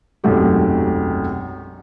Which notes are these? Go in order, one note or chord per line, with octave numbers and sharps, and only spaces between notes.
E1 B1 F#2 C3 A3 G4